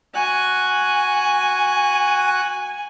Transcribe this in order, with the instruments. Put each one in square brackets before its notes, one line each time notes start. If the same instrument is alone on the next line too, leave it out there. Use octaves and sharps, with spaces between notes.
[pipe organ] F#4 F#6 [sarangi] G#5